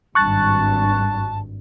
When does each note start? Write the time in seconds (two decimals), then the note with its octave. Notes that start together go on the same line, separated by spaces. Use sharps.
0.15 G#1 G2 A5 C#6 F#6 A6